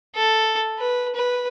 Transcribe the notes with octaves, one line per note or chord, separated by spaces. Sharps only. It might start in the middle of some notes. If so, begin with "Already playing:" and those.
A4
B4
B4